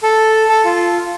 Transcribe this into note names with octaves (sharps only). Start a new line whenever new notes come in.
A4
A4
F4